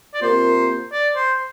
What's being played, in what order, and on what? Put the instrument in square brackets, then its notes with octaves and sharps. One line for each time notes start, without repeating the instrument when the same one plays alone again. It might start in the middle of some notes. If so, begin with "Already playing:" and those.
[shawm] D5
[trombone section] C3 A#3 F4 A#4 [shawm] C5
[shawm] D5
C5